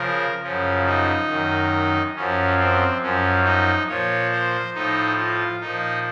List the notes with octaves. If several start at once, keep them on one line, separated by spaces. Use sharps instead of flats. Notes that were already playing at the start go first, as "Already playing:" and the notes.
Already playing: C#3 F3 A#4
F#2 C#3 F3 C#4
D#4
F#2 D#3
F#2 F3 C#4
C4
F#2 F3 C#4
D#4
A#2 F3 C#5
C5
A2 F3 D#4
F4
A#2 F3 D#4